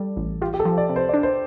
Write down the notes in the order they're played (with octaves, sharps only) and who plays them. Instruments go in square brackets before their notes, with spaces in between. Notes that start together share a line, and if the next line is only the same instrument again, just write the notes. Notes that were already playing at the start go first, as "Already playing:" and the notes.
Already playing: [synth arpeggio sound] G3 [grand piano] A4 D5
[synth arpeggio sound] A1
[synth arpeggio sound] F4 [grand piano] G4
[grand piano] G4
A4
[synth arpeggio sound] F3
[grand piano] D5
[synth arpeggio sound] C3
[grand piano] C5
[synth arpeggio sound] D4 [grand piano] D5
[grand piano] C5